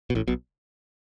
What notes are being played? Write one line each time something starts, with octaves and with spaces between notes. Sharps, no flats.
B2
A1 A2
B1 B2